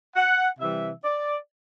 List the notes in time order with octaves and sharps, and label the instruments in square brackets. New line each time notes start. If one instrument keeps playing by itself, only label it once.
[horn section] F#5
C3 E3 G3 E5
D5